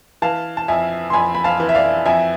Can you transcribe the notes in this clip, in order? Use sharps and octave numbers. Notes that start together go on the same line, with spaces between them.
E3 F5 A5
A5
F2 E5 G#5
C6
F2 G#5 B5
B5
F5 A5
E3
E5
D5 F5
F2 E5 G#5